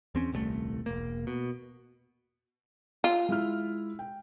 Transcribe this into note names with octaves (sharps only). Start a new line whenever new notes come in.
E2 C4 C#4
D#1 C2 B2 A3
E1 A#3
B2
F4
G#3 E4 F6
G5